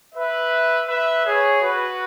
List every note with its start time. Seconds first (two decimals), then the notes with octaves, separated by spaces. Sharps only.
0.15 B4 E5
0.88 B4 E5
1.25 G#4 C#5
1.62 F#4 B4